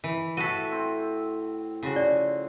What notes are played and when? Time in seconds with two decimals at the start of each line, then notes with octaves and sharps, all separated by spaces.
0.04 E3
0.37 A2 F#4 A4 B6 D#7
0.72 C4
1.83 C#3 F3 F#4
1.96 D5